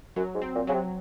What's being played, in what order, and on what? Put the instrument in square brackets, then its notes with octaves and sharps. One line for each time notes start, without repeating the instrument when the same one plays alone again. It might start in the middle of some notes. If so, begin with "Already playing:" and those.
[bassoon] F#2 [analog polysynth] F#3
[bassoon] G#2
[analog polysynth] C4
[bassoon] A#2
[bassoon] C#3 [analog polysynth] F#3
[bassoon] C3